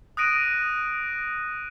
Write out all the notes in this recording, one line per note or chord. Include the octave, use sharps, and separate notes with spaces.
D#6 F#6 A#6 D7 D#7